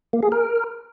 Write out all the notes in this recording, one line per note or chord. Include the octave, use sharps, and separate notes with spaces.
A#3
G#4
A#4